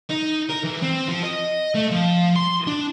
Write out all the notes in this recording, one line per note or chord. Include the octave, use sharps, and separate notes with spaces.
D#4
A#4
E2
C4
F3
D#5
A3
F3
C6
D4